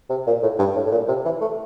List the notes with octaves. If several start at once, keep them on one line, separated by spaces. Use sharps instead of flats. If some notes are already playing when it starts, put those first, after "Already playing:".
C3
A#2
A2
G2
A2
A2
A#2
C3
E3
A3